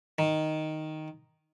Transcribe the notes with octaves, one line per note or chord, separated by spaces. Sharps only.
D#3